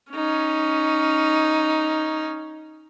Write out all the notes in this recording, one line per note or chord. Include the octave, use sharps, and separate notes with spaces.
C#4 D#4